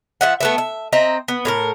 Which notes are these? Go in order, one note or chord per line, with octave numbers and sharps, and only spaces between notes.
F3 E5 F#5
A3 B3 E5
E5
C4 D#5 E5 A#5
B3
A2 G4 A#4